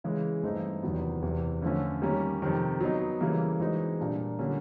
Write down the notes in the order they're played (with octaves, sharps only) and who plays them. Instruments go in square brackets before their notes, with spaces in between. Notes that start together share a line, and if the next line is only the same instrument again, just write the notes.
[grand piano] C#3 E3 G#3
G2 E3 A3 C4 D#4
E2 C3 D#3 F#3 B3
E2 C3 E3
D3 F3 A3 C#4
D#3 G3 A#3 C#4
F2 C3 D#3
F#3 B3 D#4
C#3 E3 G3 A#3
E3 G#3 C4 D#4 F#4
A#2 G3 A#3 D4
D3 G3 A#3 C#4